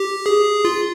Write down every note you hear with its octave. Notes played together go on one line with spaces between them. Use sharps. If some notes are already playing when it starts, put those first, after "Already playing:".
Already playing: G4
G#4
F4